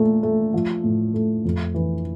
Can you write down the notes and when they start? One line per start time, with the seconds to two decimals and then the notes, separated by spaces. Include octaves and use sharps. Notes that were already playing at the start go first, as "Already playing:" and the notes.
Already playing: A#2 A3
0.23 A3
0.54 F3
0.84 A2
1.14 A3
1.45 F2
1.74 E3